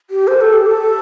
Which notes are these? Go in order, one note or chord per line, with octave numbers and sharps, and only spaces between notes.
G4
C5
A4
G4
A4